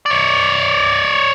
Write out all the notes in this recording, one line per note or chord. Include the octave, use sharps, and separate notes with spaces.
C#5 D5